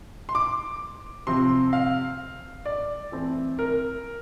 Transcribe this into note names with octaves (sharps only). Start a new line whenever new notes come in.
C6
D6
C3 F3 C4 C6
F5
D5
E3 A3 C4
A#4